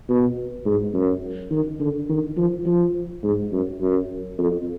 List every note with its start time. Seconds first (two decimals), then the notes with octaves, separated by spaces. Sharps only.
0.09 B2
0.65 G#2
0.94 F#2
1.51 D#3
1.80 D3
2.10 D#3
2.37 F3
2.66 F3
3.23 G#2
3.52 F#2
3.81 F#2
4.38 F2